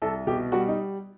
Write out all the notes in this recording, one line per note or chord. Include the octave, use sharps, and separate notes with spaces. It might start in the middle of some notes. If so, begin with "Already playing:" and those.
C2 A4
B2 G4
G3 F#4
D#4